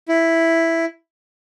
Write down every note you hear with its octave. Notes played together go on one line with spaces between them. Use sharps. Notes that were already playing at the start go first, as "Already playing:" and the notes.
E4